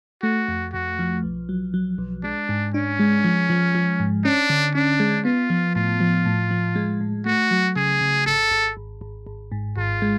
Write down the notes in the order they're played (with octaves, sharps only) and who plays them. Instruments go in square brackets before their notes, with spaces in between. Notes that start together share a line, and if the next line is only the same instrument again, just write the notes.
[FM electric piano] A3 [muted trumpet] F#4
[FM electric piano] F2
[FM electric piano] F2 [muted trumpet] F#4
[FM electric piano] F3
B1
F#3
F#3
B1
[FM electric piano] G#3 [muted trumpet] D4
[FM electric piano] G#2
[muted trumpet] C#4 [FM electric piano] D4
[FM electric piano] G#3
F3
F3
F3
G#2
[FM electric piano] C#4 [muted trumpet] D4
[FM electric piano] D3
[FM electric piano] C#4 [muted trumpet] D4
[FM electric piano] G#3
[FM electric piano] B3 [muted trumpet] F4
[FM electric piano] F3
[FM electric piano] A2 [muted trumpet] F4
[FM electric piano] F3
A2
F3
G#3
A2
[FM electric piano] A3 [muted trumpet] F#4
[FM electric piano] F#3
[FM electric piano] C#3 [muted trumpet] G#4
[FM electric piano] C#3
[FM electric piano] G#1 [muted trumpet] A4
[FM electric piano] G#1
G#1
G#1
G#1
G#2
[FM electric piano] G#1 [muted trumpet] F4
[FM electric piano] G#3